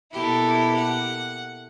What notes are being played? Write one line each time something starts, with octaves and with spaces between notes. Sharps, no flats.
B2 A#3 E4 G4 A4
F#5